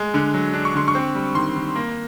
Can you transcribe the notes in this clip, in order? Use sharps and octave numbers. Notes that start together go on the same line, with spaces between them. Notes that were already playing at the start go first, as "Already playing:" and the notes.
Already playing: G#3
D3
F#3
D4
C#6
D3 C6
C#6
C4
G3
D#3 C6
D#3
A#3